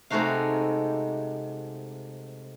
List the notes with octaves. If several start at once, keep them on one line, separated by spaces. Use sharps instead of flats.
C3 G#3 A3 D#4 F#4 F5